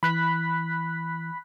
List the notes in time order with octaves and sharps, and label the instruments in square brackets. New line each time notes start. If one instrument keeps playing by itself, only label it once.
[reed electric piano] E3 [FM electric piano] B5 F#6 B6